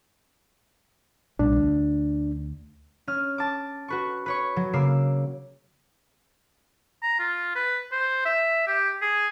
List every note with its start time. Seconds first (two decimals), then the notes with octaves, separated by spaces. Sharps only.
1.39 B1 A#2 G3 D4
1.56 D2
3.07 C#4 F6
3.38 A5 D6
3.88 F#4 B4 C#6
4.26 B4 C#5 C#6
4.56 F#3
4.73 C#3 A#3 D6 E6 C7
7.03 A#5
7.20 F4
7.56 B4
7.92 C5
8.26 E5
8.67 G4
9.02 G#4